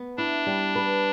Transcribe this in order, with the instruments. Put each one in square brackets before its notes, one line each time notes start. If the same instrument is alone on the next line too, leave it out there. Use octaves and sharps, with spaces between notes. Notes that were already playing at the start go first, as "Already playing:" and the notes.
Already playing: [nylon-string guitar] B3
[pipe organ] D4 [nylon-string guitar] E4
[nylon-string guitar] G3
B4